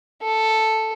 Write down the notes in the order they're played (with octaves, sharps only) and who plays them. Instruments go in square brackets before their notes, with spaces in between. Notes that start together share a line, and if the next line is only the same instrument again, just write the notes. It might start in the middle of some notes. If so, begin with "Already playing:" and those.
[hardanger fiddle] A4